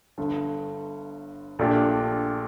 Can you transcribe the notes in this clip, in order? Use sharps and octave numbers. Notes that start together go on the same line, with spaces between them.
G1 G2 D3
A#1 A#2 A3 D4 G4